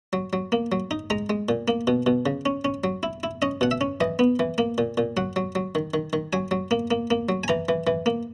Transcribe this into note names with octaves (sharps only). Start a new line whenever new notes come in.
F#3
F#3
A#3
F#3
D#4
G#3 A#5
G#3
A#2
A#3
B2
B2
C#3
C#4
C#4
F#3
E4
E4
C#4 D#5
B2 F#5
E5
C#4
E3 D#5
B3
E3
A#3
A#2
A#2
F#3 F#5
F#3
F#3
D#3
D#3
D#3
F#3 G#5
F#3
A#3
A#3
A#3
F#3
G#5
E3 A#5
E3
E3
A#3